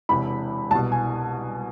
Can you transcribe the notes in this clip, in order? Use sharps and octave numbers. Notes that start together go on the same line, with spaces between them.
E1 E2 C3 B5
C2 B2 A5
G#5